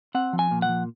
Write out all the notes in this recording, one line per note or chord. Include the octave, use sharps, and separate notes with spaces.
C4 F#5
F3
G#5
A#2
F#5
F3